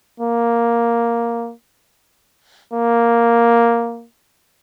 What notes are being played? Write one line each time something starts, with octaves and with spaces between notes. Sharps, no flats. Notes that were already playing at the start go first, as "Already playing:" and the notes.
A#3
A#3